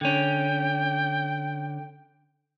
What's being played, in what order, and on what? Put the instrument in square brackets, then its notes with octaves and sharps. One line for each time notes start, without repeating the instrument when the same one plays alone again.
[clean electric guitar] D3 C#4 [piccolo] G5